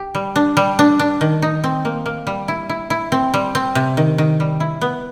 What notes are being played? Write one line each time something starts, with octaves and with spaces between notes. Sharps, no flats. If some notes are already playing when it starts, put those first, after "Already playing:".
Already playing: G4
G3
D4
G3
D4
D4
D#3
D#4
C4
A#3
A#3
G3
E4
E4
E4
C4
G3
C4
C3
D#3
D#3
G3
E4
B3